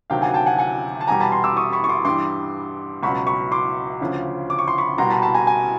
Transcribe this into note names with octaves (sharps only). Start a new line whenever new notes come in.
D2 C3 D#3 F#3 F5 G5
F#5 G#5
G5 A5
F#5 G#5
F#5 G#5
A5
E2 B2 G3 G#5 A#5
A5 B5
A#5 C6
D6 E6
C#6 D#6
B5 C#6
C#6
C6 D6
G2 E3 G3 C6 D6
C#2 B2 F#3 B5 C#6
B5 C#6
C6 D6
D2 C#3 F3
D6
C#6
C6
B5 C#6
C2 B2 G3 A#5 C6
A5 B5
A5 B5
G#5 A#5
G#5 A#5